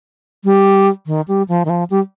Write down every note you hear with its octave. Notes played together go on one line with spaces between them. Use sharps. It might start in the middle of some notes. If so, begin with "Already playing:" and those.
G3
D#3
G3
F3
D#3
F3
G3